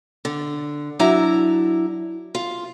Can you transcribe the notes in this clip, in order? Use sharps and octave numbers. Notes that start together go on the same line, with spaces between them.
D3
F#3 D4 E4 A#5
F4